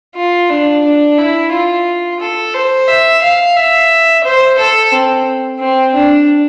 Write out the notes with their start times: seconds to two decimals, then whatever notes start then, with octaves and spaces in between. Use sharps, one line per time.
0.16 F4
0.50 D4
0.84 D4
1.18 E4
1.52 F4
2.20 A4
2.54 C5
2.88 E5
3.22 F5
3.56 E5
4.24 C5
4.58 A4
4.92 C4
5.59 C4
5.94 D4